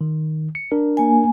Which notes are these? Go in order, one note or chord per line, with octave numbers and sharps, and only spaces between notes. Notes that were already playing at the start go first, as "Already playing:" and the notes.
D#3
C#7
D4 A#4
A#3 G#5